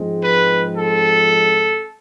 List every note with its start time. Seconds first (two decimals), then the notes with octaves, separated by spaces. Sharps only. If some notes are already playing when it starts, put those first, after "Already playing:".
Already playing: G#2 F3 G#3 C4
0.23 B4
0.75 A4